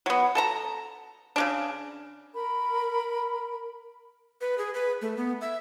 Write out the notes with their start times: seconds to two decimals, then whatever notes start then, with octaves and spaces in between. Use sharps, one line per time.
0.06 F#3 B3
0.35 A4 A5 A#5
1.36 C#3 G#3 D4
2.34 A#4 B5
4.41 B4
4.58 G#4
4.74 B4
5.02 A3
5.17 B3
5.41 E5